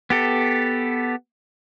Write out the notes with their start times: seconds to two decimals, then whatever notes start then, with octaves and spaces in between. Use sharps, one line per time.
0.10 B3 G4 A4